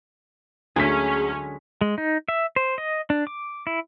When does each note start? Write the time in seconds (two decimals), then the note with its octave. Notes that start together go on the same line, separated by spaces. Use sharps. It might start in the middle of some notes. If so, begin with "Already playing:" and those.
0.76 D2 D3 F#3 G#3 C#4 G#4 B6
1.81 G#3
1.98 D#4
2.28 E5
2.56 C5
2.78 D#5
3.10 D4
3.27 D6
3.67 E4